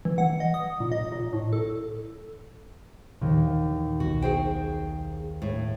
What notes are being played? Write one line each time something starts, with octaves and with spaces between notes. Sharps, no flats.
E3
F#5
D#5
D#6
A#2
D#5
A#2
A2
A4
D#2 A#2 D#3 E3
B1 B2 F#4
G#4 C5 G5
A2